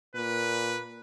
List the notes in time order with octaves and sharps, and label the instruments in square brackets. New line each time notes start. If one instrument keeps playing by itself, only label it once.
[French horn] A#2 [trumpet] B4